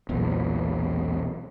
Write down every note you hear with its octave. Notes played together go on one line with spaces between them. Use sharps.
E1 B1 A#2